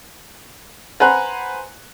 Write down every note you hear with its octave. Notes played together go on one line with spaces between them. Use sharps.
B4 C5 F#5 G#5 A#5 F#6